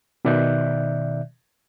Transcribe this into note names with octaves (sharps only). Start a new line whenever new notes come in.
B2 D#3 D5 E5 F#6 G6